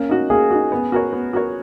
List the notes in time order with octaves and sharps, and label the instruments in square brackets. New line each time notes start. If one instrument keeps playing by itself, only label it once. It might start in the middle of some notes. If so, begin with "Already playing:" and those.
Already playing: [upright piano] A#3 [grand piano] C#4
[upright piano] D#4 F#4
[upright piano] A#3 [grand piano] G#4
[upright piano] D#4 F#4
B3
F#4 A#4 C#5
B3
F#4 A#4 C#5